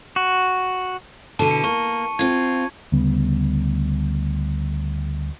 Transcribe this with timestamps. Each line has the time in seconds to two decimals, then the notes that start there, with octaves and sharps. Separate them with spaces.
0.16 F#4
1.39 B2 D3 E4 A5 D#7
1.51 C#7
1.64 A#3 C#6
2.19 C4 F4 G#6
2.92 D2 C#3 G3 B3